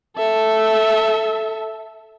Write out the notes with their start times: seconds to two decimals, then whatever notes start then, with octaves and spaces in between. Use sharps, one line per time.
0.17 A4 E5